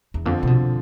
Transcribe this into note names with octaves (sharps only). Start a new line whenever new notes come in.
E2
F2 D3 F3 C4
C3
B2